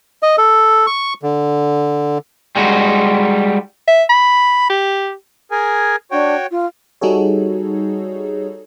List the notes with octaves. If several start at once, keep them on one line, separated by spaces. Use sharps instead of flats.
D#5
A4
C#6
D3
G3 G#3 D#4 F#4
E5
B5
G4
G#4 A#4 G#5
D4 F#4 C#5 G5
F4
G3 D#4 F#4 G#4 A4 C#5